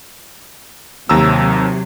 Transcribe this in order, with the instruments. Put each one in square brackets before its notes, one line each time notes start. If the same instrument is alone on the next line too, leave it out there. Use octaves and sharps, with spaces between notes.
[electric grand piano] D#2 A#5 E6 [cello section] C3 F#3